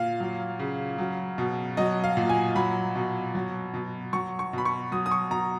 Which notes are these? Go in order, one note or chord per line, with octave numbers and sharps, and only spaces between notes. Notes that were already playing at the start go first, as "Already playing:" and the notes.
Already playing: A#2 F5
F#3
C#3
F#3
B2
F#3 D#5
F5
A#2
G#5
F#3 B5
B2
F#3
B2
F#3 C#6
C#6
B2 B5
C#6
F#3 D#6
D#6
C#6
B2 A#5